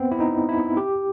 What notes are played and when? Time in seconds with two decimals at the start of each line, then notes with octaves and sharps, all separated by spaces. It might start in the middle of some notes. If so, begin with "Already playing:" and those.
Already playing: B3 C4
0.11 E4
0.20 D#4
0.49 E4
0.77 G4